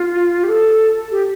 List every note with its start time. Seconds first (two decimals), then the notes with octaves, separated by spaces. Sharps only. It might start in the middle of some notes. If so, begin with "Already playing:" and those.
Already playing: F4
0.43 G4
0.48 A4
1.12 G4